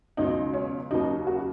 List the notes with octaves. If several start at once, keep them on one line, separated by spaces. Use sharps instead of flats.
C#2 B2 F#3 D#4
C#4
D#2 C#3 F#3 D#4
F#4